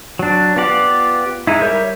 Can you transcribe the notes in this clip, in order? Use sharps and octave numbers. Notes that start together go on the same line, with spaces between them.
F#3 D4
B3 F4 G4 D5
G#3 D#4 E4
G3 A#4 C#5 E5 G6